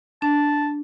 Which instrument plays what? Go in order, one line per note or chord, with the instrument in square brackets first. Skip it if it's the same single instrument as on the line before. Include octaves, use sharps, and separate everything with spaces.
[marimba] D4 [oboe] A5